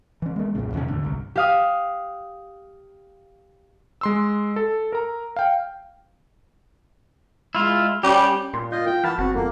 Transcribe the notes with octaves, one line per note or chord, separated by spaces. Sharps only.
E3 C#4
G#3 A#3
B1 F#2 A#2 C#3
E2 C3 D#3 C#4
D#2 A2 D3
G1 C2
G4 F5 D#6
G#3 C6 E6
A4
A#4 A#5
F5 G5
G#3 E4 F4
G3 C#4 G4
A#2 C6
F4 D#5 G6
F4 G5
E3 F#5 A5 B5 F6
F#1 C4 F#4
F2 A#3